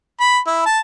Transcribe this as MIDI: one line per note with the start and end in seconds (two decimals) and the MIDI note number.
0.20 0.38 83
0.47 0.65 64
0.66 0.79 81